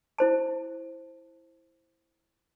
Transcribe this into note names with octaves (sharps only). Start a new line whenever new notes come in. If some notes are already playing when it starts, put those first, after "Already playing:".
E4 C5 A5